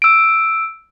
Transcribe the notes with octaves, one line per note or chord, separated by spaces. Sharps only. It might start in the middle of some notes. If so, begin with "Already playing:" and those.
E6 D7